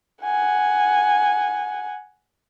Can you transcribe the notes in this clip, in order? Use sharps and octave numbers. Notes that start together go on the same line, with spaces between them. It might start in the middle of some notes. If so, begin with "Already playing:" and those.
F#5 G#5